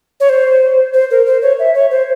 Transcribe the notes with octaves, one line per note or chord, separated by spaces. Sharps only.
C#5
C5
C5
A#4
C5
C#5
E5
C#5
C5